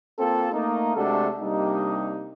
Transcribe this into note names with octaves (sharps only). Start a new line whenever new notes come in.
A#3 C4 F4 A4
A3 A#3 D#4
C3 G#3 A3 D4 F#4 A4
C3 G3 A#3 D4 D#4